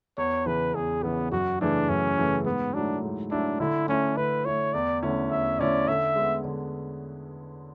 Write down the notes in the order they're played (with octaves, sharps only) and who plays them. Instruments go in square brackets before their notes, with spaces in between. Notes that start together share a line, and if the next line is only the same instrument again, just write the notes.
[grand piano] E2 [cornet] C#5
[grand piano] C#3 E3 [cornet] B4
[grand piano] E2 [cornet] G#4
[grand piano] C#3 E3 [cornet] B3
[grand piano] F#2 [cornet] F#4
[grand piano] C#3 E3 A3 [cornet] D4
[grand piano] F#2 [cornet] C#4
[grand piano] C#3 E3 A3
[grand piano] G#2 [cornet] B3
[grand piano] F#3 A3 E4 [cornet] D4
[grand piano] G#2
[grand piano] F#3 A3 E4 [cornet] D4
[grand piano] D3 [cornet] E4
[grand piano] A3 E4 [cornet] C#4
[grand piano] D3 [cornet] B4
[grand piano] A3 E4 [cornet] C#5
[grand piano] E2 [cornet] D5
[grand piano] D3 A3 C#4 E4
[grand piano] E2 [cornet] E5
[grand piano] D3 A3 C#4 E4 [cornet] D5
[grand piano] D3 [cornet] E5
[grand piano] G#3 B3
D3